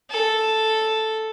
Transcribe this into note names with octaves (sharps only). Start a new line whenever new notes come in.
A4